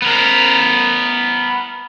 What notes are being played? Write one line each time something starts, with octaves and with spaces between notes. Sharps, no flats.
B3 A#4